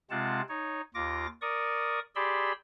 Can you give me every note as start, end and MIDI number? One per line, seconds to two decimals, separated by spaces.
0.10 0.41 48
0.10 0.41 56
0.10 0.41 60
0.10 0.41 65
0.10 0.41 78
0.10 0.41 81
0.49 0.81 63
0.49 0.81 73
0.94 1.27 39
0.94 1.27 65
0.94 1.27 86
0.94 1.27 94
1.42 1.99 70
1.42 1.99 74
1.42 1.99 85
1.42 1.99 87
2.16 2.52 67
2.16 2.52 68
2.16 2.52 74
2.16 2.52 83
2.16 2.52 84
2.16 2.52 88